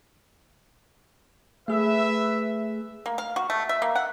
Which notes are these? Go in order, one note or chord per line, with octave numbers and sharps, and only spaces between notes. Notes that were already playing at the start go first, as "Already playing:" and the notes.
A3 G#4 B4 E5
A#3
F5
F#4
A3
E5
A#3
F#5